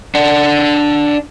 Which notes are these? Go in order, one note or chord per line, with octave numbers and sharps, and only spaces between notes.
D4 F#5